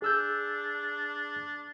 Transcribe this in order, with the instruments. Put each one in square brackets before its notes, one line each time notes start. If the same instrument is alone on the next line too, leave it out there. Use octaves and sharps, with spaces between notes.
[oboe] D4 [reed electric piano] G#4 E6 G6